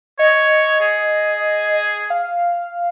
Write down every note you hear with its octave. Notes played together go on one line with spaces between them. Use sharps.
C#5 D#5
G#4
F5